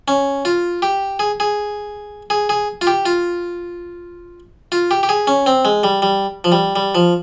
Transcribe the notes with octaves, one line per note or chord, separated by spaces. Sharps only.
C#4
F4
G4
G#4
G#4
G#4
G#4
F4
G4
F4
F4
G4
G4
G#4
C#4
C4
G#3
G3
G3
F3
G3
G3
F3